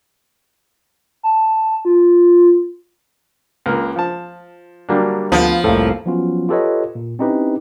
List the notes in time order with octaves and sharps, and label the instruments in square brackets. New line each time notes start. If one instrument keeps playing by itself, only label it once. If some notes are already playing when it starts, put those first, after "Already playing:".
[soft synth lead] A5
F4
[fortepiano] C#2 A#3 A#4
F3 A5
[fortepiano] D3 F#3 [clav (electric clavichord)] G3 A#3 D4
[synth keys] D2 [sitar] F3 [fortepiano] B3
[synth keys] C2 F2 [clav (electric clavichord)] A2 [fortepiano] A#3 A4
[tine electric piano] F3 F#3 B3 C#4 F4 F#4
F4 G4 A4 B4 C#5 D#5
A#2
C4 C#4 D#4 E4 G4 B4